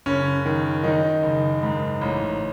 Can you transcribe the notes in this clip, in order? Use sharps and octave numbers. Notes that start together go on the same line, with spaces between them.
F#1 C#4
D#3
D#3 D#4
F#1
G#2
A1